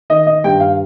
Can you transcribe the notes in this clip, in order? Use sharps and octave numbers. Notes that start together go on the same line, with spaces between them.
D#3 D#5
D#5
G2 G5
F5